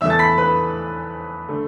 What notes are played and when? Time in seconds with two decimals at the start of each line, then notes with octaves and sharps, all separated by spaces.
0.01 E2 E3 A3 E5 E6
0.10 A5 A6
0.19 B5 B6
0.38 B4 B5
1.48 D3 A3